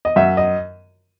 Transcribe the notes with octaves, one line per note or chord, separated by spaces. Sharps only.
D#5
F#2 E5
D#5